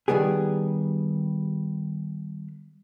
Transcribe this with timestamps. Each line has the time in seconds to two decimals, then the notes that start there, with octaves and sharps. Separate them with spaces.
0.08 D#3 G3 B3 G4 G#4